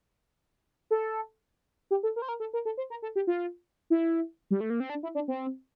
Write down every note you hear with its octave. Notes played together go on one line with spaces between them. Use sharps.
A4
G4
A4
A#4
C5
A#4
A4
A#4
A4
C5
A#4
A4
G4
F4
E4
G3
A3
A#3
C4
D4
E4
D4
C4